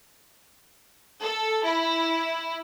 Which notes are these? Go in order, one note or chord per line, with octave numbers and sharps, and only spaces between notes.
A4
E4